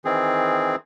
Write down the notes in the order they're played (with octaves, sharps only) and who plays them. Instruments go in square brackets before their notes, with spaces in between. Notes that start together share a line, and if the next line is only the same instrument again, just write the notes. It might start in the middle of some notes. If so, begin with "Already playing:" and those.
[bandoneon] D#3 E3 C4 G#4